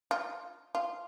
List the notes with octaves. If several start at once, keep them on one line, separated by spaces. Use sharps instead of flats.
F4
F4